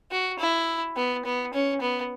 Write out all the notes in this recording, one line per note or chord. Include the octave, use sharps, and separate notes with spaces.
F#4
E4
B3
B3
C#4
B3